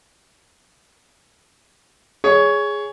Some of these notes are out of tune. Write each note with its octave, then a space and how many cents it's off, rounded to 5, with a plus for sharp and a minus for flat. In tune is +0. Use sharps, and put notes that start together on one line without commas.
G#4 +0 C#5 +15